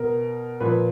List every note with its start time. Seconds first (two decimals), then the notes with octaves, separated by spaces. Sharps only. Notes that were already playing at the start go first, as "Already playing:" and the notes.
Already playing: B2 A#4
0.60 A#2 F3 B4